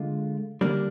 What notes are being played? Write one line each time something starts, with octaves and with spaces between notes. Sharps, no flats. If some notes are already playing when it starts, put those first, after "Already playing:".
Already playing: D3 G#3 D4 F4
D3 G3 A#3 D4